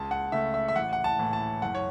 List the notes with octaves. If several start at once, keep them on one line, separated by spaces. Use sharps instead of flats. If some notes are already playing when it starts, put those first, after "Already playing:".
Already playing: C#2 A5
F#5
C#3 A3 E5
E5
E5
A1 F#5
F#5
A5
A2 E3
A5
F#1 F#5
C#5